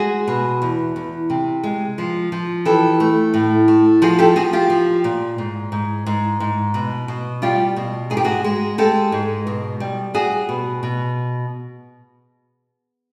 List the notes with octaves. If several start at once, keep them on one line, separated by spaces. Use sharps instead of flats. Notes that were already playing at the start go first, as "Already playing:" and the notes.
Already playing: G#3 F#4 G#4
B2
E2
E2
C3
G#3
F3
F3
E3 G4 A4
A3
A2
A3
F3 F#4 G#4
G4 A4
F3 F#4 G#4
F4 G4
F3
A#2
G#2
G#2
G#2
G#2
B2
B2
G3 F4 G4
B2
G#2 G#4
G4
F#4 G#4
G#3
G#3 G4 A4
G#2
B2
G3
G3 F#4 G#4
B2
B2